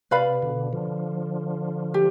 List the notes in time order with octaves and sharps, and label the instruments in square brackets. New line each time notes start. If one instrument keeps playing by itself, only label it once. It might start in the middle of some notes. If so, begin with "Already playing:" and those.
[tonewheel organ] C3 [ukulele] B4 D5 F5 B5
[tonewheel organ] B2 D3
D3 F3
[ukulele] G4